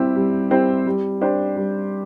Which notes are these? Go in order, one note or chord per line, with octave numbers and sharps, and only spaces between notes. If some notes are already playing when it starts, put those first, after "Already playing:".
Already playing: G3 C4 E4 G4 C5
G3
C4 E4 G4 C5
G3
D4 G4 C5
G3